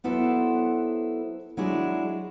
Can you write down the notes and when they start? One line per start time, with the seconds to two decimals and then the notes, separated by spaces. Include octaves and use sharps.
0.04 F#3 B3 E4 A4 B4 C5
1.57 F#3 G#3 D4 E4 G#4